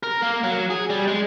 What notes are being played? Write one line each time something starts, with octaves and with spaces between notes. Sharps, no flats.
A#4
A#3
F#3
G#4
G3
G#3